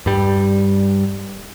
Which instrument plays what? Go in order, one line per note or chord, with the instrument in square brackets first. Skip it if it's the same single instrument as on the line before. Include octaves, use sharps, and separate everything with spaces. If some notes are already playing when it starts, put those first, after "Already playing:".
[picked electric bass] G2 G3